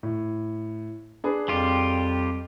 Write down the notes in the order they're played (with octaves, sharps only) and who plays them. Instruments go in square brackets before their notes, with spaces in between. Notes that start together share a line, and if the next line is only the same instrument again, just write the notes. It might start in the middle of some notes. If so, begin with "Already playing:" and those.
[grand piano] A2
D4 G#4 B4
[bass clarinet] F2 [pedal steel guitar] G3 F4 G4